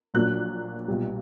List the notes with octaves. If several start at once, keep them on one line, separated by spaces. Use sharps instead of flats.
A#1 A#2 F#3 A#3 D4 F#6
B1 A#2 G3